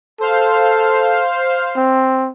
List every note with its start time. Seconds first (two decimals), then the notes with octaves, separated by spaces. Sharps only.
0.21 A4 C5 F5
1.76 C4